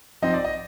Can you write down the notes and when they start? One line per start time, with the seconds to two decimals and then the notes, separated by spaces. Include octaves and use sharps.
0.22 F3 C4 D#4 D#5
0.34 D5
0.44 D#5